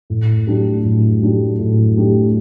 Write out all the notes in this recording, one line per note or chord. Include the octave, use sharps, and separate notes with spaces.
A2
F#3 A3 D4 G4
A2
F#3 A3 D4 G4
A2
F#3 A3 D4 G4